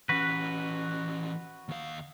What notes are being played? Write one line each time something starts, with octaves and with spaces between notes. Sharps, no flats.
E3 C#4 F#4 B4
D#2 F5